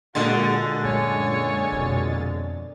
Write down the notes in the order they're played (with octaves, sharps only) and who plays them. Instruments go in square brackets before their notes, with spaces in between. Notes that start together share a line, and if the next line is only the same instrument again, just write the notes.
[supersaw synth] A#2 G#3 A6 [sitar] D3 [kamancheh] F#4
[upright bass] F#2 [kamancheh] C#5 G#5
[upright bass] F2 B2